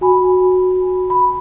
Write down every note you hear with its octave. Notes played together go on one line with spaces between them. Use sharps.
F#4 G#5 B5
B5